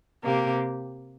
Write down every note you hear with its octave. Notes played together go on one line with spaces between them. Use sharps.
C3 A#3 G4